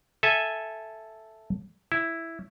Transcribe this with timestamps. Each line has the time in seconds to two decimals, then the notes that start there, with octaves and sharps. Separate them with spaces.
0.23 A4 E5 G#5
1.92 E4